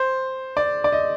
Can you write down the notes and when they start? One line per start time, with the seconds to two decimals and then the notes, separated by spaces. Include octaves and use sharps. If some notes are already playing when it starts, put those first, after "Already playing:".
Already playing: C5
0.57 D5
0.84 D5
0.92 D#5